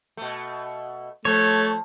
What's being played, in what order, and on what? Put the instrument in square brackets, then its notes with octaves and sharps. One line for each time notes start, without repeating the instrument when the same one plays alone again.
[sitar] B2 A3
[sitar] F3 [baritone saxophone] A3 [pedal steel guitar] C#5